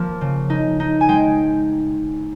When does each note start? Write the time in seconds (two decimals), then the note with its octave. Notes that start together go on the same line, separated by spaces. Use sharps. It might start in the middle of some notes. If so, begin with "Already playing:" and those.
Already playing: F3 A#3
0.21 C#3
0.50 D#4
0.80 D#4
1.01 G#5
1.09 G#3 G5